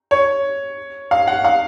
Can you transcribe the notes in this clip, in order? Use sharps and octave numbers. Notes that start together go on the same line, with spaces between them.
C#5
F5
F#5
F5